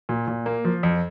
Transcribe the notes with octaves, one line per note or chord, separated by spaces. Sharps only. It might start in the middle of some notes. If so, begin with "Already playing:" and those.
A#2
A#2
A#3
F3
F2